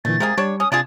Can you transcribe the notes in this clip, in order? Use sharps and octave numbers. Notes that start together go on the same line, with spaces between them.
A#2 D3 E3 A3 A6
C3 G#3 A#3 G#4
G3 D4 C#5
C#4 D#6
C3 D4 F4 G#4 A6